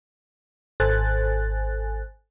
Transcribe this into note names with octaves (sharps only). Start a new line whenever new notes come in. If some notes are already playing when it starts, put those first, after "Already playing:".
G#1 A4 C5 G#5 F#6 A6